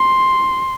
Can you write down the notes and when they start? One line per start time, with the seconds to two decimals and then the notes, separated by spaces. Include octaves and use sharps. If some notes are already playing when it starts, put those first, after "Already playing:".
Already playing: C6